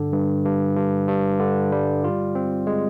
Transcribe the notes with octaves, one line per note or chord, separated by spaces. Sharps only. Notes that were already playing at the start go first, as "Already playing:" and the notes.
Already playing: G2 D3
G2
G2
G2
G2
D3
G3
F4
C4
G#3